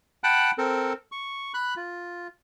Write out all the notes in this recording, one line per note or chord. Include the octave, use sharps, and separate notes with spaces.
F#5 G5 A5 B5 F#6
C4 A4 A#4
C#6
B5 F#6
F4